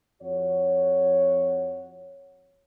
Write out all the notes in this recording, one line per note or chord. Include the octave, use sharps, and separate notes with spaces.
F2 F#4 C#5